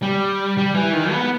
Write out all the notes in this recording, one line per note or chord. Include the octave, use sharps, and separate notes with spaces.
G3
G3
E3
D#3
B3